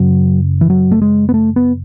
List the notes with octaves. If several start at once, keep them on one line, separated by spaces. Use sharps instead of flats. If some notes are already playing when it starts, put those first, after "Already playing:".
Already playing: F#2 C#3 F#3
E3
F#3
A3
G#3
B3
A3
B3